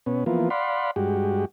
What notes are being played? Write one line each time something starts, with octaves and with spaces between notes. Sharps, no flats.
B2 B3 C#4
E3 F3 A#3 B3 F4
D5 F5 F#5 B5 C6
G2 G#3 F#4 G4